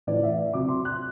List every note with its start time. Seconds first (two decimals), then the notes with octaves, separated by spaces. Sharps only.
0.07 A2 E3 D5
0.23 E5
0.53 C3 F#3 D6
0.68 C6
0.85 F#6